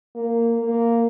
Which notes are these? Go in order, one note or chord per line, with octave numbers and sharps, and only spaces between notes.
A#3
A#3